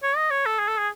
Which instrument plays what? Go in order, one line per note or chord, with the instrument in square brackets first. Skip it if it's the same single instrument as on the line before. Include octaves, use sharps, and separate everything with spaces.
[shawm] C#5
D#5
C#5
A4
G#4
A4
G#4